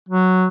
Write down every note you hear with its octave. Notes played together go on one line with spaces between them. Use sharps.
F#3